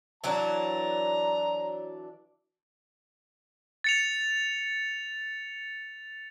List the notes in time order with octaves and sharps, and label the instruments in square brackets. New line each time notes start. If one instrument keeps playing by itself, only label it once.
[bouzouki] E3 F#3 D4 [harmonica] A#5
[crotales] A6 C#7 F7